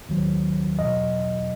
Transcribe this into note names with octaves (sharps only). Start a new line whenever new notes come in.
D#2 D#3 F#3
E2 B2 F#3 D#5